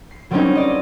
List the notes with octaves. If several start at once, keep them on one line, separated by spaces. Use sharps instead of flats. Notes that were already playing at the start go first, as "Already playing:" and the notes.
C7
F#3 G3 A#3 C4 C#4 D#4
D5 D#5